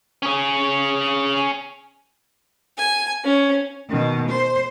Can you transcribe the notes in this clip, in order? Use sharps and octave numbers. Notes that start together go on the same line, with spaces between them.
C#4 G#4
G#5
C#4
B2 D#3
C5